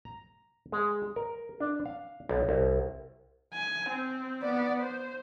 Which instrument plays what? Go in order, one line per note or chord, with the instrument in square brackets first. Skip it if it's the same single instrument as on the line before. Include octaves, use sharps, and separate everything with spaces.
[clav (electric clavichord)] A#5
G#3
A#4
D4
F5
B1
C2
[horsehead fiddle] G#5
C4
B3 D5
C5